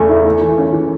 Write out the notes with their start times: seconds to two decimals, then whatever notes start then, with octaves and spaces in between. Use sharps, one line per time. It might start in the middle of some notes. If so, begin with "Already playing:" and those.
Already playing: E2 C#3 A3
0.09 E4
0.25 A3
0.42 E3
0.58 C#4
0.73 E3